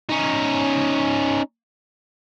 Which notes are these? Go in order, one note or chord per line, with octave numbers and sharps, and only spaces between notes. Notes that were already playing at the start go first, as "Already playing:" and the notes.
C#4 D#4